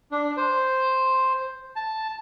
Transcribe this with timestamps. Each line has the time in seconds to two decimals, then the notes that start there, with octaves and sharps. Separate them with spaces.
0.12 D4
0.37 C5
1.76 A5